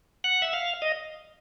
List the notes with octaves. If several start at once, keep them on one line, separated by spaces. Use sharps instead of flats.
F#5
E5
F5
D#5